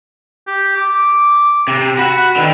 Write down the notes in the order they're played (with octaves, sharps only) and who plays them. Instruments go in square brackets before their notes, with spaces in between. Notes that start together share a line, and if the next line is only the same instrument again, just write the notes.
[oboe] G4
D6
[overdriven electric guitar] C3
[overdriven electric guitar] F#4 F#5 [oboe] B5
[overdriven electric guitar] D3 D#3 [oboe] B4